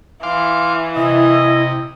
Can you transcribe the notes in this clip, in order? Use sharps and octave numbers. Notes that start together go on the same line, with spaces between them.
E3 F5 C6 D6
C3 E4 D#5